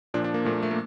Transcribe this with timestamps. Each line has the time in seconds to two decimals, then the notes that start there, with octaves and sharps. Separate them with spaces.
0.14 A#2 F3 D4
0.24 D4
0.34 A#3
0.45 A#2 F3 A3
0.54 A#3
0.63 A3
0.71 A#3